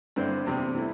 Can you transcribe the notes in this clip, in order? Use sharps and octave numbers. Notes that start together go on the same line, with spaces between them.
G2 D3 C4 E4 C5
E2 C3 G3 C4
E3 A3 E4